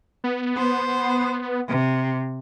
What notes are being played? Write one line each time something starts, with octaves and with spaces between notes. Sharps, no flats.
B3
C5
C3